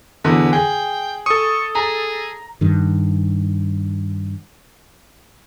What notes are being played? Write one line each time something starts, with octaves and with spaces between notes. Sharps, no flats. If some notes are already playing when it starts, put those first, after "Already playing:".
E2 B2 D3 B4
G#4 G5
A4 C#6 D#6
G#4 A#5
G2 D#3